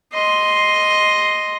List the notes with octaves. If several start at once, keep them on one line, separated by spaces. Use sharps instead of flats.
D#5 C6